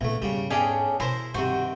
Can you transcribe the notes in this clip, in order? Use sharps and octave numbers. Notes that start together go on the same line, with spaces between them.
E2 A#2 C#3 A3
E2 G#2 C#3 G3
B1 C#4 D4 G#4 D5 G5
B2 E4 A#4 C5 C6
G2 C3 D#3 D#4 F#4 C5